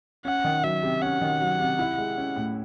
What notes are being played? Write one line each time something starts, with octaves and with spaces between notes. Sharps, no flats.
C#4 F#5
D#3
F#3 E5
C3
C#4 F#5
D#3
F#3
C3
E4
G#3
C#4
A2